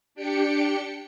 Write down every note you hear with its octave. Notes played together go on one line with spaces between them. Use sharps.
D4 G4 G5 C#7